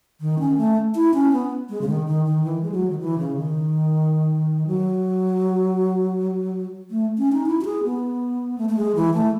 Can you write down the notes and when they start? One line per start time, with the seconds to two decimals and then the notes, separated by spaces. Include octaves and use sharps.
0.21 D#3
0.39 C#4
0.57 A3
0.95 E4
1.14 C#4
1.32 B3
1.70 G#3
1.81 C#3
1.88 D#3
2.07 D#3
2.25 D#3
2.44 E3
2.63 G#3
2.72 F#3
2.90 D#3
3.00 E3
3.18 C#3
3.37 D#3
4.67 F#3
6.91 A3
7.18 C#4
7.33 D#4
7.46 E4
7.61 F#4
7.65 G#4
7.84 B3
8.58 A3
8.69 A3
8.77 G#3
8.95 E3
9.14 A3